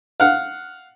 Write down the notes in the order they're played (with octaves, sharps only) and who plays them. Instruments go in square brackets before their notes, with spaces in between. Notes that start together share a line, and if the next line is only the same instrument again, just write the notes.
[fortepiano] F5 F#5